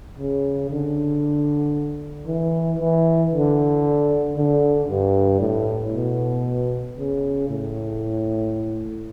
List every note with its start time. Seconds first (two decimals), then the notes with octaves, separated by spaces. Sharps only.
0.19 C#3
0.71 D3
2.27 E3
2.79 E3
3.32 D3
4.36 D3
4.88 G2
5.40 A2
5.93 B2
6.97 C#3
7.49 A2